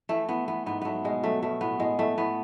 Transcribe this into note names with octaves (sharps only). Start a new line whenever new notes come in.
E3 A3
E3 B3
E3 B3
G#2 B3
F#3 A3 B3
B2 G#3
F#3 A3
B2 A3
A2 B3
A2 G#3
A2 A3
A2 B3